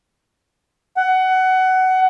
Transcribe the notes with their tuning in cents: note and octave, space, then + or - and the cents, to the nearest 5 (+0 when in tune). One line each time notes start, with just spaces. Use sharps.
F#5 +20